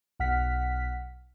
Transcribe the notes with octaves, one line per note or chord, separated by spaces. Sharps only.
B1 F#5 F6 B6